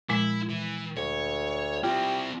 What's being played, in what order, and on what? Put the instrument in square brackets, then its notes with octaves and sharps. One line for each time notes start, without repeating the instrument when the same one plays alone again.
[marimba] A#2 F3 G#3 [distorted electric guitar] E4
[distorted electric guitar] E3
[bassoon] D2 [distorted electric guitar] C#5
[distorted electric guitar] C4 E4 [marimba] F4 [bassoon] G4